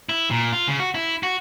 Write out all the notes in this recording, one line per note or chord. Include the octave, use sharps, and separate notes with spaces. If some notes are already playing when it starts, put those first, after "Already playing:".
E4
A#2
F4
C#3
F#4
E4
F#4